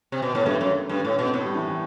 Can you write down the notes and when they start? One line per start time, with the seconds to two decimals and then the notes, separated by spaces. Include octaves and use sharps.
0.12 C3
0.22 B2
0.35 A2 B3
0.46 G2 A3
0.61 F#2
0.89 G2
1.05 A2
1.19 B2
1.25 C4
1.34 A2 B3
1.45 G3
1.55 E3
1.67 E3